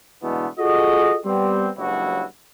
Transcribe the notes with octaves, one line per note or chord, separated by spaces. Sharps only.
B2 D3 E3 G#3 A3 B3
F4 F#4 G#4 A4 D#5
G3 B3 C4
F#1 C#2 G2 F#3 E4 F#4